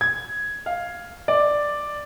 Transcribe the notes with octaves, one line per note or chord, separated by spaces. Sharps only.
G#6
F5
D5